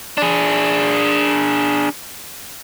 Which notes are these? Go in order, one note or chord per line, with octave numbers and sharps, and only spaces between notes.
D4 G#4